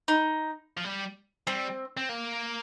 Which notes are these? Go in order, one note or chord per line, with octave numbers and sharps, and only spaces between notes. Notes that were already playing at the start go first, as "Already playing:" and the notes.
D#4
F3
G3
G3 C4
C4
A#3